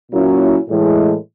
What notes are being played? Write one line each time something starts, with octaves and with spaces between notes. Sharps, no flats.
A#2 F#3 A#3 C#4 E4
A2 E3 G#3